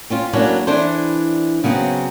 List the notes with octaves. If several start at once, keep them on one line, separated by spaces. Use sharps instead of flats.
C4 C#4 F4
F#3 A3 A#3 C#4 D4 E4
E3 D4 E4 A4 C5
C#3 F#3 B3 C4